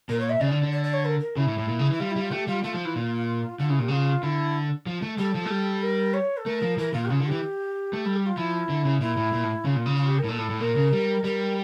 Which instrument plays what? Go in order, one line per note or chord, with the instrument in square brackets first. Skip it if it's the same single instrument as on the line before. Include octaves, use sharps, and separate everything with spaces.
[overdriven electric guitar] A#2 [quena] A#4
[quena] C#5
E5
[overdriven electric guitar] C#3 [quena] D5
[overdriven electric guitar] D3
D3
[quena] D5
D5
C#5
A#4
A#4
[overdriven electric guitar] C#3 [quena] E4
[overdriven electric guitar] A2
A2
A#2
C#3
E3
[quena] E4
[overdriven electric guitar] G3 [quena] F4
[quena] E4
[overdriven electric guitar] G3 [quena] F4
[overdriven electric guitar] A3 [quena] G4
[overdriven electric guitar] G3 [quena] F4
[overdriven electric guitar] A3 [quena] F4
[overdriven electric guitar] F3
E3
A#2
[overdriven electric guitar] D3 [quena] F4
[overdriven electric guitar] C#3 [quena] E4
[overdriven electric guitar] A#2 [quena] G4
[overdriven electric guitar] C#3 [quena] F4
[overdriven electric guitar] D3 [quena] E4
[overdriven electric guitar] F3
A3
[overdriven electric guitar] G3 [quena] A4
[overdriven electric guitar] F3
A3
G3
[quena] A#4
C#5
A4
[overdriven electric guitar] A3 [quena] A#4
[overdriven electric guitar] F3
[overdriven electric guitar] E3 [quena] A#4
[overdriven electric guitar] A#2 [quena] F4
[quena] G4
[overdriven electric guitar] C#3 [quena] F4
[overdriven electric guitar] D3
[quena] G4
[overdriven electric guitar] E3
A3
[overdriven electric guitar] G3 [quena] A4
[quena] G4
F4
[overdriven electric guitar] F3 [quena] E4
[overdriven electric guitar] D3
C#3
[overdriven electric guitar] A#2 [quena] E4
[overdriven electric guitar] A2
A#2
A2
[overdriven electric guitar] C#3 [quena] F4
[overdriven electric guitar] A#2
C#3
[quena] F4
G4
A#4
[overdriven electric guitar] A2
[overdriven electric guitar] A#2 [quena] A4
[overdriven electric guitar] A2
A2
[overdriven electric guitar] A#2 [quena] A#4
[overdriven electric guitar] C#3
G3
[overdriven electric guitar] G3 [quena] A#4